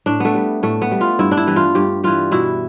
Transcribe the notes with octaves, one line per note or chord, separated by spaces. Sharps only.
A2 D4
A3 B3
G3
A2 A3
B3
G3
F4
G2 E4
D4
E4
E3 G3
F4
G2 G4
E3 G3 F4
B2 E4